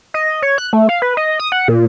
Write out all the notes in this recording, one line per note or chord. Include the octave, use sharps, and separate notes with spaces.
D#5
C#5
F#6
A3
F5
B4
D#5
D#6
F#5
A#2